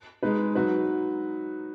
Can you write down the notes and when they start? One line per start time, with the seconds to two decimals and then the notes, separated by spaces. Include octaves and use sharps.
0.23 G#3 D#4 B4
0.55 F#3 D#4 F#4 B4